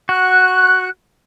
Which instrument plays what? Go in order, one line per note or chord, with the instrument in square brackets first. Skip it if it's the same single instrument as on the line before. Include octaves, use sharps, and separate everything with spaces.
[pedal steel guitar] F#4 [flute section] F#6